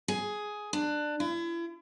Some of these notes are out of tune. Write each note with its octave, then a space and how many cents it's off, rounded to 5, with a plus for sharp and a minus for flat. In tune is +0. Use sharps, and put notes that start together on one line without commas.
G#4 +10
D4 +20
E4 +40